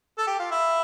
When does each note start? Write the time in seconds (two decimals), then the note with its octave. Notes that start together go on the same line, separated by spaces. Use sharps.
0.18 A4
0.27 G4
0.39 F4
0.51 E4